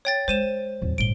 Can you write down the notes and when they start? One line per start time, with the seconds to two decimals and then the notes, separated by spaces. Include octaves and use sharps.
0.05 C#5 G5 A6
0.28 G#3 C5 D#7 E7
0.82 D1 E2
0.98 G1 A2 D7 G7